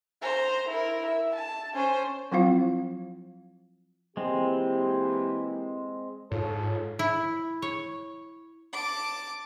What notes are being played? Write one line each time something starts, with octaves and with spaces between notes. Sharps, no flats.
C5 A#5
E4 A#4
E5
A5
C#4 C5
F3 F#3 C4 E4 F4 F5
E3 G#3 A#3 C4 G4
G#2 F4 A4 C#5
E4
C#5
A5 D6